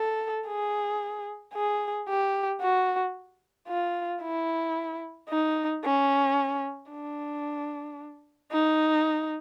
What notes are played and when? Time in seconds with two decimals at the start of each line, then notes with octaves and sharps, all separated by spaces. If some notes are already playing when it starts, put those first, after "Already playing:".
Already playing: A4
0.48 G#4
1.54 G#4
2.09 G4
2.61 F#4
3.69 F4
4.23 E4
5.30 D#4
5.84 C#4
6.91 D4
8.52 D#4